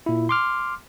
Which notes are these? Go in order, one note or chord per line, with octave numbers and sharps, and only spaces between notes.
A#2 E4
C6 D6 F6